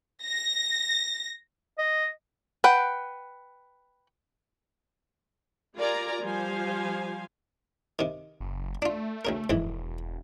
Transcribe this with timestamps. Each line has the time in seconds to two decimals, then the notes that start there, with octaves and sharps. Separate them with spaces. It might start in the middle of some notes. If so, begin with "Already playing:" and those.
0.25 A#6
1.78 D#5
2.64 B4 F#5 G5
5.75 F4 G4 A#4 D5 G#5 A#5
6.21 F3 G3 C5 F5 G#5
7.99 C3 D#3
8.40 F#1
8.82 A3 D4 F4
9.25 D2 C#3 A#4
9.50 E1 F2 G#2 E3